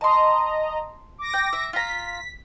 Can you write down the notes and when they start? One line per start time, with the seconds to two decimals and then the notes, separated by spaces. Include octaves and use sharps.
0.01 D#5 A5 A#5 C6
1.18 D6 A#6
1.34 G5
1.53 E5
1.73 F4 A#5 B6